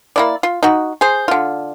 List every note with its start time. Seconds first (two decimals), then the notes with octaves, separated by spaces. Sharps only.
0.16 A#3 E4 D5
0.43 F4
0.63 D#4 F#4
1.01 G#4 C5
1.28 D3 F4